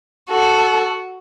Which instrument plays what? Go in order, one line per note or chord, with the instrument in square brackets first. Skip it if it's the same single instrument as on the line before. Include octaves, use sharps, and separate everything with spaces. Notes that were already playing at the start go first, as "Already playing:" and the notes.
[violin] F#4 [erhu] A4